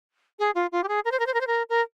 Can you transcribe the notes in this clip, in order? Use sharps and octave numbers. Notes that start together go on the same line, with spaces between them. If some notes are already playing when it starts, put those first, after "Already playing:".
G#4
F4
F4
G4
G#4
A#4
C5
A#4
C5
A#4
C5
A#4
A#4